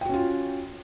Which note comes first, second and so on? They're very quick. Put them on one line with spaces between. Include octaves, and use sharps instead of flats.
G5 F#4 C#4 F4